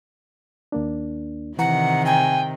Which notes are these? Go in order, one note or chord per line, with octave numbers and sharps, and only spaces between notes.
D#2 A#3 D4
C3 D#3 E3 F#5 A#5
G5 G#5